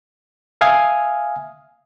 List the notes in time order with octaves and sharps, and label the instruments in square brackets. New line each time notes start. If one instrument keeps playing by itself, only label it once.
[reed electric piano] E5 F5 G#5 D#6 F6